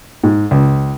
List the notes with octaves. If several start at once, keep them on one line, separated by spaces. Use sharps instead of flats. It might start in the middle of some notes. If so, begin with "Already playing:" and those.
G#2
C#2